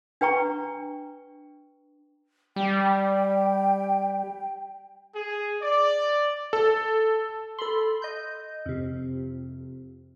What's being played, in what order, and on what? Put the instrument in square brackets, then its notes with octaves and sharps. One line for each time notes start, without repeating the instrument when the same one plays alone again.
[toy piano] D4 B4 G5 A#5 C#6
[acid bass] G3 [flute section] G5
[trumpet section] G#4
D5
[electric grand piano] A4
[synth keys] A4 B5 C6
D#5 G6
F2 C3